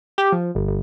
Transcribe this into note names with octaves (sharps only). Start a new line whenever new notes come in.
G4
F3
G1
G1